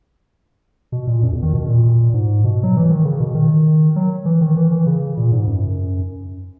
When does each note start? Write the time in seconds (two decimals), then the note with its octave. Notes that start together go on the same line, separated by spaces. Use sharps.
0.92 B2
1.07 A#2
1.23 F#2
1.33 E2
1.43 D#3
1.53 B2
1.68 A#2
2.14 G#2
2.44 B2
2.63 F#3
2.77 E3
2.91 D#3
3.05 C#3
3.20 B2
3.35 D#3
3.96 F#3
4.26 E3
4.41 D#3
4.56 E3
4.71 E3
4.87 C#3
5.17 A#2
5.32 G#2
5.47 F#2